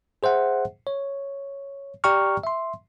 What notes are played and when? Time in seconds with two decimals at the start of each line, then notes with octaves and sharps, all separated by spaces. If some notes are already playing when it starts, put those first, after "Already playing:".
0.23 G#4 C5 E5 F#5
0.87 C#5
2.04 G4 D5 G5 A#5 C#6 F6
2.44 E5 C6